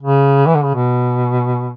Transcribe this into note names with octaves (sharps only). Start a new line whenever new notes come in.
C#3
E3
D3
C#3
B2